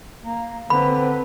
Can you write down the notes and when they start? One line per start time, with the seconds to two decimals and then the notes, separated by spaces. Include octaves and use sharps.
0.23 A#3
0.70 D3 C4 B4 B5